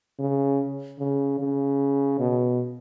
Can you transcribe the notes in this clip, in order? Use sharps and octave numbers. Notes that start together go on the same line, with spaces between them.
C#3
C#3
C#3
B2